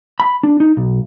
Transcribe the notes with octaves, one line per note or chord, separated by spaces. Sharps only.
B5
D4
D#4
B1